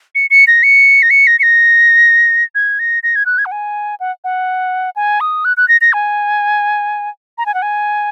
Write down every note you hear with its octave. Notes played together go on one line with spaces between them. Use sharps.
C#7
C#7
A#6
C#7
A#6
C#7
A#6
C#7
A#6
G#6
A#6
A#6
G#6
F#6
G#6
F#5
G#5
F#5
F#5
G#5
D#6
F#6
F#6
A#6
A#6
G#5
A#5
G#5
F#5
G#5